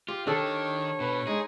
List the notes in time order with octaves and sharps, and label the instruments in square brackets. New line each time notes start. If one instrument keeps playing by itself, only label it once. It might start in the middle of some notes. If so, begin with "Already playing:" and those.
[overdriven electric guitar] F4 [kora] G4
[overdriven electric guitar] D#3 [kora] D4 A4 [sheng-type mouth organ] C#5
[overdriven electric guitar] B2 [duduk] B4
[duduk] G#3 [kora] D#4 [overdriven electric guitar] G#4